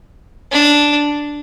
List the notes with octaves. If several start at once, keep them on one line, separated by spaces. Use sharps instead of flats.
D4